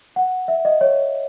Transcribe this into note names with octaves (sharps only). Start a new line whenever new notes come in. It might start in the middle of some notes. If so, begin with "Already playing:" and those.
F#5
E5
D#5
C#5